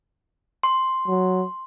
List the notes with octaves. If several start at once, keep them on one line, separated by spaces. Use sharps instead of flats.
C6
F#3